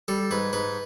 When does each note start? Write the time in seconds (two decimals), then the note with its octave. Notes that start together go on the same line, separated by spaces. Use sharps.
0.08 G3 A4
0.31 G#2 B4
0.53 G#2 B4